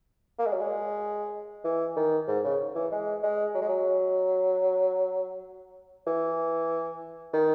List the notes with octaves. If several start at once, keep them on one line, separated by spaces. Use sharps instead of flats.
A#3
G#3
F#3
G#3
E3
D#3
G#2
C#3
E3
G#3
G#3
F#3
G#3
F#3
E3
D#3